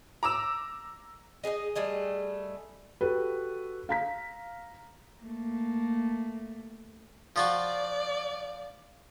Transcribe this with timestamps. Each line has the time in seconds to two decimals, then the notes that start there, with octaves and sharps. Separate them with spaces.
0.23 A#5 D6 E6 E7
1.44 D#4 G#4 A#4 D#5
1.75 G3 A3 G#4 D#5
3.01 F#4 G4 A4 B4
3.89 F5 A#5 B6
5.23 A3 A#3
7.36 F3 F4 F#4 D5